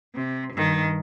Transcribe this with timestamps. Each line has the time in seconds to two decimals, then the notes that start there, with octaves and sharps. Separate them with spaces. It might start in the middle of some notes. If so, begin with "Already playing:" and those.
0.15 C3
0.53 G2 D#3